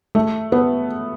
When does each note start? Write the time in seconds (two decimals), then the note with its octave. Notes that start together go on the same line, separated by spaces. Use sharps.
0.15 A3
0.52 B3